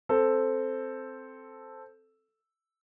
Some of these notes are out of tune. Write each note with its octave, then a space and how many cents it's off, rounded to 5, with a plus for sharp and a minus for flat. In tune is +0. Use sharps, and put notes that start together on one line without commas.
C4 +0 A4 +0